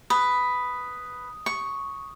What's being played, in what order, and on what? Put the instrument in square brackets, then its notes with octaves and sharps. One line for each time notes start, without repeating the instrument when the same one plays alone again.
[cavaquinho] B4 [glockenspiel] D#6
[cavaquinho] C#6